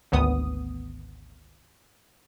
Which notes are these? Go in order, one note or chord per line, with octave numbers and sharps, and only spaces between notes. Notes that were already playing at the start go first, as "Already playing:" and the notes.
G#1 D2 B3 D#6